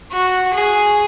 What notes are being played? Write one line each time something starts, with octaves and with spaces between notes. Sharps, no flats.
F#4
G#4